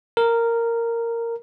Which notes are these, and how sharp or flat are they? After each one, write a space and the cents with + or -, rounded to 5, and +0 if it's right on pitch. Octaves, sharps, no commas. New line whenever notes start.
A#4 -10